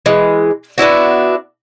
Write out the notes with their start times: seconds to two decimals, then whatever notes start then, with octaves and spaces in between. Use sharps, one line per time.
0.06 E3 G#3
0.78 B3 D4 E4 F#4